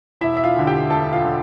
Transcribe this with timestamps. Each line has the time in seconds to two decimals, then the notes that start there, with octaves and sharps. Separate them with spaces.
0.21 E1 E4 E5
0.37 E5
0.44 F4 F5
0.56 D2 D3
0.67 G4 G5
0.90 E1 A4 A5
1.13 F4 F5
1.25 D3